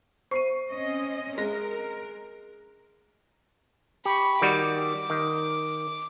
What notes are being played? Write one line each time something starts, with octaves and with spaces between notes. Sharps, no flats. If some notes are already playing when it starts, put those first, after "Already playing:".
C5 C#6 C7 D#7
C4 C#4 D#5
G#3 A#4 A#6
G4 B5 C#6
D#3 G3 F#4 D6
D#3